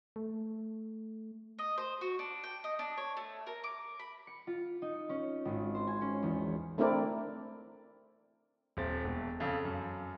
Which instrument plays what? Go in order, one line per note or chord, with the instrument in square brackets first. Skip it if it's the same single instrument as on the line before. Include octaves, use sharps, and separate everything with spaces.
[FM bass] A3
[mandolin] D#5
C5
F#4
D4
G5
D#5
D4
C#5
A3
A#4
D6
B5
[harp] C#7
F4
D#4
C#4
G#1
C5
G#5
C#4
E2
[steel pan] A3 C4 D4 E4 A#4 D5
[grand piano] D#1 C4 A6
E1
F2 C#3
F#2